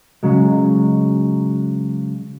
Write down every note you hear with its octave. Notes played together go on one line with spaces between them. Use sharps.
C#3 F#3 G#3